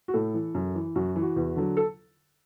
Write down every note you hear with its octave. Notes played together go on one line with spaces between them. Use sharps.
F#4
A2 A4
E3
F#2
E3
F#2 F#4
E3
F#4
E2
D3 F#3
A4